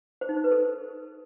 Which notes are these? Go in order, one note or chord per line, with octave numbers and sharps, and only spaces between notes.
C5
D#4
C5
B4
A4